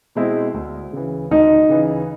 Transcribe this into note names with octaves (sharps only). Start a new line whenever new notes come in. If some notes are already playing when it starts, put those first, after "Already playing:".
B2 G#3 C4 E4
D2
C#3 E3
D2 D#4
C#3 E3